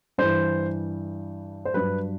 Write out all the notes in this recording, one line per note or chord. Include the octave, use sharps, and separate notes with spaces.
G2 E3 C5
C5
G2 F#3 B4